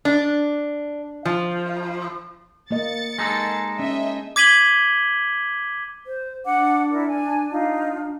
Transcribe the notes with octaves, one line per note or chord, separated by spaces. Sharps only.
D4
F3
A#3 D#5 A6 C#7
G#3 D#4 A4
C#4 D#5 E5
D6 G#6 B6 D#7 F#7 G7
C5
D4 F#5 D6
E4 A#4 D5
G#5
D#4 F4